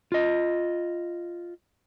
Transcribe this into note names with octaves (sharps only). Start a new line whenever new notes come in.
F4 D#5